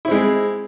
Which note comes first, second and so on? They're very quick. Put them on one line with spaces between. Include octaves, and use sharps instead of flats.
E4 C4 G#3